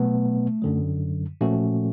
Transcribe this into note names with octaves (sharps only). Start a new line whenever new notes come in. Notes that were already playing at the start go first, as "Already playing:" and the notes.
Already playing: B2 F#3 A3 B3
F#2 D3 F#3
A#2 F3 A3 C#4 F#4